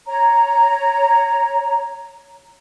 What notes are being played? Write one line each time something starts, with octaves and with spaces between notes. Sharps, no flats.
C#5 A#5